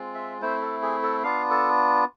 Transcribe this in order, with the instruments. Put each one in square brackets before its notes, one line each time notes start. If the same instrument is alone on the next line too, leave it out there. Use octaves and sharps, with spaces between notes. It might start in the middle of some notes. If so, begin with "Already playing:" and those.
Already playing: [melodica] G#3 C4 F4
E5
A3 C4 E4 C5
A4
G#4
A4
B3 D4 F4 F5
A4